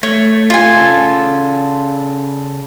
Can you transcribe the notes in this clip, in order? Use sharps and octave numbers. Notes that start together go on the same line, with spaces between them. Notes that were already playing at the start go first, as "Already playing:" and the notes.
A3 C#5
F4 G#5
C#3 A4